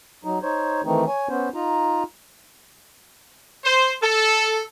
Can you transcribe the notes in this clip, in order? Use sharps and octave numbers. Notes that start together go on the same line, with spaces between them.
F#3 D#4
D#4 C5 C#5
D#3 E3 A3 C4 D#4
C#5 G#5
B3 C#4 C5
D#4 F4 A#5
C5
A4